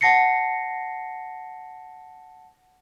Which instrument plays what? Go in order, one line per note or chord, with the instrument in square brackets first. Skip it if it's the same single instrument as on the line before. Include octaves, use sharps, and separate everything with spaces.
[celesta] F#5 A5 A#6 C7 C#7